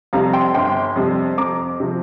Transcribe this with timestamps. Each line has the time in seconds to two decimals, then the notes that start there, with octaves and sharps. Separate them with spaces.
0.13 F2 C3 G3 F5 A#5
0.33 G5 C6
0.54 G1 G5 C6
0.96 F2 C3 G3
1.38 F2 A#5 D6
1.80 C3 F3